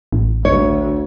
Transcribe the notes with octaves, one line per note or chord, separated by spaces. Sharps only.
A1
D2 C#5